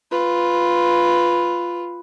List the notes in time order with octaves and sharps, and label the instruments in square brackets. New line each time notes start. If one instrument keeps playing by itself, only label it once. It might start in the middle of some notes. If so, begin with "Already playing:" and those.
[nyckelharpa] F4 B4